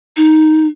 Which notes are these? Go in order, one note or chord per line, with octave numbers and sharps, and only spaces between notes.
D#4